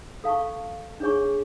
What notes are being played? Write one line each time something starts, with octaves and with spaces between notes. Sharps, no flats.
A4 F5 A5 C#6
D4 G#4 C#5 G#5 C#6